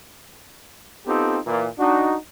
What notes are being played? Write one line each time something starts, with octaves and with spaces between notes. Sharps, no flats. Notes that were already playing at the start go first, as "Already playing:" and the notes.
B3 C4 D#4 F4 G4 A4
A#2 E3
D4 D#4 F#4